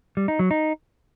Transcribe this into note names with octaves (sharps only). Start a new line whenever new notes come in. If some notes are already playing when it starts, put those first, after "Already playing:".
G3
D#4
F#3
D#4